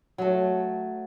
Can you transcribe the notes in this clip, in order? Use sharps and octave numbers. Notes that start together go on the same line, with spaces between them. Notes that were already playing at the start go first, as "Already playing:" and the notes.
F#3 A3